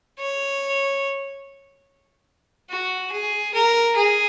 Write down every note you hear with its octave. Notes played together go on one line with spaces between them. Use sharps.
C#5
F#4
G#4
A#4
G#4